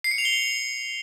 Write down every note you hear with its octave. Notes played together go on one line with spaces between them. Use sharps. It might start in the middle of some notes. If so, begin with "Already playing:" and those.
C7
C#7
F7
G7